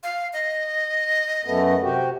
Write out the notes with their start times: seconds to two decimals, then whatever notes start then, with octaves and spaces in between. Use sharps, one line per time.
0.03 F5
0.33 D#5
1.45 F#2 A3 B3
1.83 C3 F#4 G4